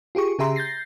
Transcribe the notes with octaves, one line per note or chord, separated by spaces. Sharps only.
F4 G4 G#4 C#6
C#3 G4 G#4 E5 A#5 C6
G6 A6 A#6 C7